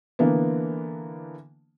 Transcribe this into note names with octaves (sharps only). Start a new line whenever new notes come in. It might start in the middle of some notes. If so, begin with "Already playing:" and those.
D3 E3 A#3 B3